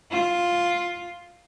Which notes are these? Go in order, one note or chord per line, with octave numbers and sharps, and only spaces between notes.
F4